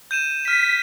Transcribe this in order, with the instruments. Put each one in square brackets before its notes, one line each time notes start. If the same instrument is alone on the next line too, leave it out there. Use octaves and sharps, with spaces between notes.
[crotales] G6 D#7 E7
[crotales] F6 D#7 [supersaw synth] B6